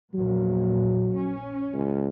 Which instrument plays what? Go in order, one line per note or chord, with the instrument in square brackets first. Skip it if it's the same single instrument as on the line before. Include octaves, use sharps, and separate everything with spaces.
[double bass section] A#1 E2 A#2 [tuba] F#3
[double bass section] C#4
[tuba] C#2